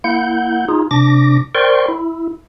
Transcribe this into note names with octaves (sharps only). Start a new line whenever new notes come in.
A#3 E4 F#5 G6
D#4 F4 G#4
C3 D4 D6 A#6
A#4 C5 D5 G5 C6 C#6
E4